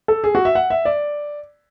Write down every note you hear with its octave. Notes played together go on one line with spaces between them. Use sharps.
A4
G#4
F#4
E5
F#5
E5
D5